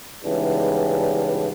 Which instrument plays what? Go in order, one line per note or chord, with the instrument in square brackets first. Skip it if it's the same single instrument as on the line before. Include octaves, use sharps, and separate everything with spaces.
[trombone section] G#2 C#3 E3 G3 B3 D4